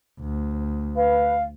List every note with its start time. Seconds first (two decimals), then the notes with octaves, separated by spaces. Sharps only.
0.20 D2
0.97 B4 F5